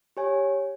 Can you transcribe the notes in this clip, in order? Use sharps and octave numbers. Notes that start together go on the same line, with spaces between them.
G4 C#5 G#5